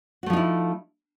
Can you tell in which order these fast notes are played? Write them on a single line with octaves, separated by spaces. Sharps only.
F#4 A3 F3 D#4 E4